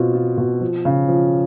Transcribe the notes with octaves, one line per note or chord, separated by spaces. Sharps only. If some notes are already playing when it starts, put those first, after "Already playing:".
Already playing: B2 C4 F4
F4
B2
F3
C#3
F3